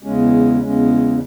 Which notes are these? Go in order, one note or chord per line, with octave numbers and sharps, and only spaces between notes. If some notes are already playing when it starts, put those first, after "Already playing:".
E2 C#3 G#3 C#4
E2 C#3 G#3 C#4